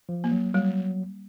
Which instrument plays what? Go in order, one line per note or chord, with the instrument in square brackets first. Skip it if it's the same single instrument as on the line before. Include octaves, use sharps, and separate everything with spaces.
[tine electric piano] F3
[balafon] A#3
[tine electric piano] F#3
[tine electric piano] F#3 [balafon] G3